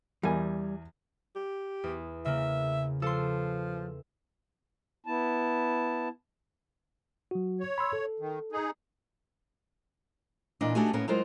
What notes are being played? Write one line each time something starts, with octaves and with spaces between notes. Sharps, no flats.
E2 G3 A#4 G#5
G4
E2
C#3 A#3 E5
F3 A4 C6
B3 E4 A5
F#3 F#4
C#5
B5 C6 E6
A4
D#3
D#4 G#4
A#2 E3 D4 D#5
A3 D4 D#4 F#4 G4 G#5
A2 A#3 B3 C#4 A#4
F#3 G#3 F4 A#4 C5